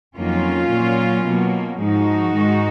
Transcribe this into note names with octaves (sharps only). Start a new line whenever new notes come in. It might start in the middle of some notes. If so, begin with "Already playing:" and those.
F2 D#3 F#3 A#3 C#4 F4
A#2 F#3 A#3
B2 F#3 A#3
G#2 F3 G#3 D#4 F#4
G#2 D#3 G#3